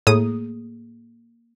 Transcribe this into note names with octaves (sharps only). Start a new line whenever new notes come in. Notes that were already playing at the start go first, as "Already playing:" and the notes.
A2 A#3 G#4 D#6